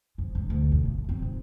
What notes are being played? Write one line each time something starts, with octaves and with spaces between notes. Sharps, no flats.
G#2
D3
D2
B2
G1
C4
G#2